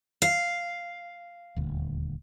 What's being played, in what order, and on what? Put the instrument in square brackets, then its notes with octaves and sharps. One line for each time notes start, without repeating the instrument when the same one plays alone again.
[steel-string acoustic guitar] F5
[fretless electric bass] D#1 D2